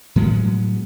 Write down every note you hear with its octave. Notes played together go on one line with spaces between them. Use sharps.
A2 F#3 G#3 B3